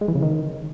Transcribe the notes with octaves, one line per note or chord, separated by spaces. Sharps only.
G#3
E3
C#3
D#3